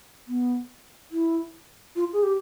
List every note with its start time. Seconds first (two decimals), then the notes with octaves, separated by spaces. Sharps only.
0.28 B3
1.12 E4
1.96 F4
2.13 G#4
2.23 G4